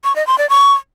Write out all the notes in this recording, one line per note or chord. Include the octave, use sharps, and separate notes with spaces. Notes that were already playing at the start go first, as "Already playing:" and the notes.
C#6
D#5
C6
D5
C#6